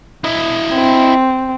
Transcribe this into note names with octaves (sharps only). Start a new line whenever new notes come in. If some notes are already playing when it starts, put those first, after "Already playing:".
E4 D#5
C4